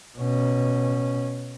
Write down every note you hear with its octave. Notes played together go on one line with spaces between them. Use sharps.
B2 C#4